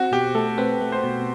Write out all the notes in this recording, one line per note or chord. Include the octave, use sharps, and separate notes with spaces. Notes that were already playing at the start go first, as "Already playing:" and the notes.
Already playing: C4 F#4
B2 G4
A3 A4
C4 B4
A3
C5
B2